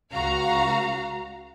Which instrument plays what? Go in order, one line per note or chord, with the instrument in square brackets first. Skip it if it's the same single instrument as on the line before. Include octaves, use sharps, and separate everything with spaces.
[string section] C#2 F#4 F5 A#5